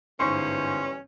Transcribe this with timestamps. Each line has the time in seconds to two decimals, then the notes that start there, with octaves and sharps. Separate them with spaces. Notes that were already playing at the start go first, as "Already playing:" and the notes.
0.20 G1 G#2 E3 G3 C#4 C5 C6 C#6